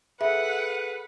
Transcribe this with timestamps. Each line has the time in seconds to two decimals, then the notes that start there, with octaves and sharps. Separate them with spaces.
0.21 G#4 A4 B4 E5 F#5